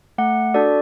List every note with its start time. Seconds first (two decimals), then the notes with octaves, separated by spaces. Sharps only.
0.18 A3 F#5
0.54 D4 F#4 A4 D5